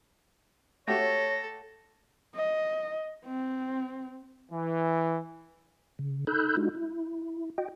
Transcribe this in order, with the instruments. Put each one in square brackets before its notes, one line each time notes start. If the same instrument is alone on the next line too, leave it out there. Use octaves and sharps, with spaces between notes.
[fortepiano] A3 F#4 G4 [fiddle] A4 [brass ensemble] C#5 [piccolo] A#6
[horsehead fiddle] D#5
C4
[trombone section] E3
[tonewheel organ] C#3
D#4 A4 B5 E6 F#6 G6
G#3 D4 D#4 F4 F#4
E4
F#4 D#5 G5